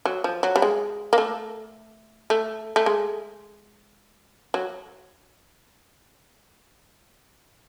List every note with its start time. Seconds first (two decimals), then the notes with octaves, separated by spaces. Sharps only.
0.05 F#3
0.24 F3
0.43 F#3
0.56 G3
0.62 G#3
1.13 A#3
1.18 A3
2.30 A3
2.76 A3
2.86 G#3
4.54 F#3